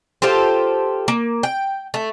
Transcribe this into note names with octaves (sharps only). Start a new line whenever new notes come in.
F4 G4 A4 C5
A#3
G5
A3